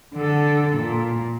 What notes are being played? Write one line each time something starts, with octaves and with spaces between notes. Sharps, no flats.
D3 A4
A#2